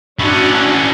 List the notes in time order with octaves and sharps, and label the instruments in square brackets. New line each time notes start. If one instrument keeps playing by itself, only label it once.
[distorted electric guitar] C#4 E4 [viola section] D4 F#4 F#5